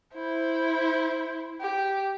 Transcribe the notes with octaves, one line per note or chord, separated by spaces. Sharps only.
E4 C5
G4